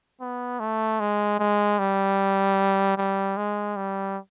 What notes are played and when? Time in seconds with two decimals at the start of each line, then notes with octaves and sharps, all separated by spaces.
0.21 B3
0.60 A3
1.00 G#3
1.39 G#3
1.79 G3
2.98 G3
3.37 G#3
3.76 G3